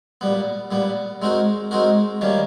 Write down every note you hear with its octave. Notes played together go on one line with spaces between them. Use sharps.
A#2 G3 B3
A#2 G3 B3
G#3 C4 D#4 F#4 A#4
G#3 C4 D#4 F#4 A#4
D#3 G3 A#3 C#4